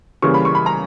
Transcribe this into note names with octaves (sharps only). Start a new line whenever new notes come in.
C#3 E3 G3 A#3 C#6
B5
C#6
B5
A#5